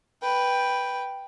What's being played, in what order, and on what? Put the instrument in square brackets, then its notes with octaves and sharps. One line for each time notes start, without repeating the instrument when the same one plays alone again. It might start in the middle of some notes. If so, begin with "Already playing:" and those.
[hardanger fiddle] B4 G5